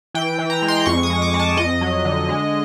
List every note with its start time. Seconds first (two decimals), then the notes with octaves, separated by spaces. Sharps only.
0.14 E3 G5
0.38 E3
0.50 A#5
0.62 G#3
0.68 C6
0.86 F2 C#6
1.03 D#6
1.10 G#3
1.22 D6
1.34 G#3
1.39 A5
1.57 F2 D#5
1.81 F#3
2.05 D3
2.29 G#3